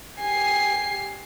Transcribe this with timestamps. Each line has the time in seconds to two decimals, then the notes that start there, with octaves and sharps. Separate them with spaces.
0.19 G4 G#5 C7